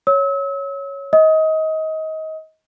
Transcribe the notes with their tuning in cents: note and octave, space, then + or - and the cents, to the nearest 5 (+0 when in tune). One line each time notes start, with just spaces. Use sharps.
C#5 +0 E6 -40
D#5 +25 D#6 +25